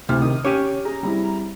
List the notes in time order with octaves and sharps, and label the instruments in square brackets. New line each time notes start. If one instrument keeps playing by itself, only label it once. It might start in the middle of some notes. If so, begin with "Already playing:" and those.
[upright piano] D2 E4 F6 [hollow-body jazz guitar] C3
[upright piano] D#3 [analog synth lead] D#6
[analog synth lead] C#4 [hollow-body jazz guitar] G4 C#5 [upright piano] D6 D#7
[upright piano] G#4 [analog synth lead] A#5
[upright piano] G3 C4 E4